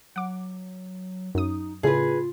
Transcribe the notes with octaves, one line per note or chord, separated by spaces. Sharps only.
F#3 F#5 D6
F#2 D#4 D#6
A2 C#3 F4 G#4 B4